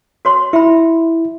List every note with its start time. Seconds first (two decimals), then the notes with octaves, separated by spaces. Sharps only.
0.25 F#4 C#5 C6
0.53 E4 E5 B5